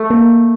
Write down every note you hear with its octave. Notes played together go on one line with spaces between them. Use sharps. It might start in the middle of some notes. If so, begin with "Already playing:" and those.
Already playing: A3
A#3